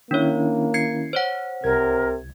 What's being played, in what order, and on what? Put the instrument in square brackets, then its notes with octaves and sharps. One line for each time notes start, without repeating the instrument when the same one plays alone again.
[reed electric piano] D#3 C#4 E4 [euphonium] A#3 [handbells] D4 C#5
[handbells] G#6 C7 C#7
C5 C#5 F#5
[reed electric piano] C2 G#6 [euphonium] C3 [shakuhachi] A#4